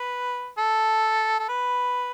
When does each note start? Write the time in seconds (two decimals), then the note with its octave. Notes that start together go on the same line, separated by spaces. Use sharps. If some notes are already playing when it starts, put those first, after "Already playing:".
Already playing: B4
0.58 A4
1.39 A4
1.49 B4